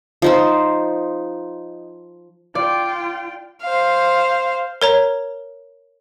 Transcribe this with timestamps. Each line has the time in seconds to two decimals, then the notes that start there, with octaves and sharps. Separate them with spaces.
0.22 F3 D#4 C5
2.55 F4 D5 G5
3.62 C5 F5
4.82 A#4 C#5 A#5